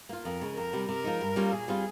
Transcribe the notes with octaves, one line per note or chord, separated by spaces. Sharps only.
A#3 F4
F2 A#4
C#3 G#3
F2 A#4
C3 G3
C3 A#4
F3 G#3 D#4
G2
G3 A#3 C#4 F4
A#2 G#4
G3 C4 F4